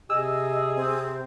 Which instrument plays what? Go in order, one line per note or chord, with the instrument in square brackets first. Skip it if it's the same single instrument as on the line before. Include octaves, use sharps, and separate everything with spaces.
[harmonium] C3 [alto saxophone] G#4 [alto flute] D#5 [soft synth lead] E6
[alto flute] C4